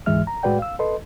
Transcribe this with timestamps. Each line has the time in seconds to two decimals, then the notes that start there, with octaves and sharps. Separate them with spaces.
0.06 D2 G#2 E3 G#3 E5 F6
0.27 A#5
0.43 A2 G#3 F#4 B4 D5 G5
0.59 F5 E6
0.79 A4 B4 D#5 C6